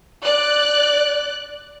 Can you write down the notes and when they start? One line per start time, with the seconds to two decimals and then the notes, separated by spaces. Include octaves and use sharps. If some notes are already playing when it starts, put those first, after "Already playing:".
0.23 D5 F#6